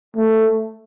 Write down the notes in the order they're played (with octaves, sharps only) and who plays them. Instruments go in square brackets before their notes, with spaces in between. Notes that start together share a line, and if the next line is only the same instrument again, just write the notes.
[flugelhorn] A3